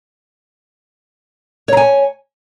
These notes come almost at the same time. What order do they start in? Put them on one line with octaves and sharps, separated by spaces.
C#5 A#5 G#5